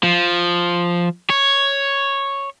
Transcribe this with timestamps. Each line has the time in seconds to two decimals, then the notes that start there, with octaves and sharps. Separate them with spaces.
0.03 F3
1.30 C#5